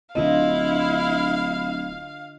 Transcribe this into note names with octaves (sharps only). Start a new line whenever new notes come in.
D1 D3 E4 F4 D#5 F5